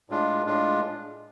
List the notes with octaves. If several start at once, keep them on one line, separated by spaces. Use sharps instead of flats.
A2 G#3 D4 F4
A2 G#3 D4 F4